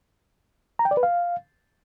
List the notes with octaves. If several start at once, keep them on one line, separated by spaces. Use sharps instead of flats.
A#5
G5
D5
B4
F5